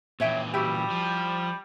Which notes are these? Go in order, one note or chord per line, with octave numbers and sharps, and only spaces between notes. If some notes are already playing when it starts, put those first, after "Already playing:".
A#2 E3 C#5 E5 G5
G3 E4 F#4 G4
F3